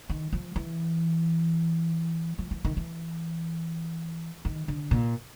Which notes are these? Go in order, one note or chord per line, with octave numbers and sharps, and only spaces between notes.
D#3
F3
E3
F3
E3
D#3
E3
D#3
D3
A#2